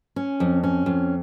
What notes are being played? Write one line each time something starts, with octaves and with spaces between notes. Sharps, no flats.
C#4
F2
C#4
F2